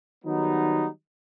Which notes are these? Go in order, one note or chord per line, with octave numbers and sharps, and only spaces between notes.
D#3 F#3 G3 B3 D#4